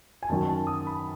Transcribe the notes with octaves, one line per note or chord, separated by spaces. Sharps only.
G#5
F#2 D#3 F#3 A5
A5
D#6
B5